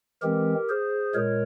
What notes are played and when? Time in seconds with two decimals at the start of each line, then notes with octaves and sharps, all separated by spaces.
0.22 E3 G#3 C4 G4 A#4
0.69 G#4 C5
1.14 A#2 G#3 A#4 C#5